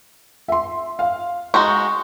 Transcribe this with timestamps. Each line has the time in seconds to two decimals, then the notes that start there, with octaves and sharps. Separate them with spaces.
0.48 E5 C6
0.99 F5
1.54 G#3 D#4 F#4 C#6